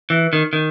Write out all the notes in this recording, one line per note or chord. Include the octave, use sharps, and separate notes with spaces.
E3
D#3
D#3